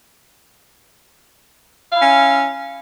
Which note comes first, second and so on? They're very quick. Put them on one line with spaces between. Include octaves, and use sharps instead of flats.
F5 E4 C#4